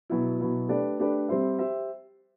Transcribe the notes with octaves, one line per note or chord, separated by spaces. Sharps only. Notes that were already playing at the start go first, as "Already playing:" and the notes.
B2 F#3 B3 E4
B2 F#3 B3 E4
A3 D4 G4 B4 D5
A3 D4 G4 B4 D5
G3 C4 G4 C5 E5
G4 C5 E5